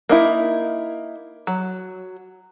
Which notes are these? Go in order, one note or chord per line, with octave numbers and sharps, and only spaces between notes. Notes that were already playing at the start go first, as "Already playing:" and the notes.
A#3 D#4 E4
F#3